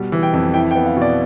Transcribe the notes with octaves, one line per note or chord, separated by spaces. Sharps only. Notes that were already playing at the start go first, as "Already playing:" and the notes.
Already playing: B2 G3
E3
G5
F2
E4 G5
G5
B3
F5
B2 D5